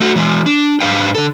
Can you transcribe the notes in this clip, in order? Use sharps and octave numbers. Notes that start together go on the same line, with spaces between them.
A3 F#4
E3 G#3
D4
G#2 D4 B4 F5 G5
D3 A4